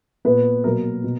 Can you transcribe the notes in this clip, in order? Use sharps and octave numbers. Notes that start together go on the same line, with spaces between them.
A#2 A#3 B3 B4
B2 F#3 A#3 A#4
B2